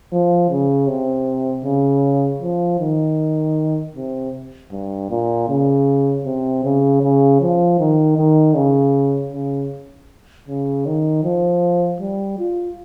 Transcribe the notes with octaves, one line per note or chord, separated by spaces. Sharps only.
F3
C#3
C3
C#3
F3
D#3
C3
G2
A#2
C#3
C3
C#3
C#3
F3
D#3
D#3
C#3
C#3
C#3
D#3
F3
G3
F4